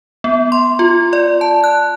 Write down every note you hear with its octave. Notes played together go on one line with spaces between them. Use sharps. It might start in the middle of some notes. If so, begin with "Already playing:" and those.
B3
C6
F4
D5
A5
F#6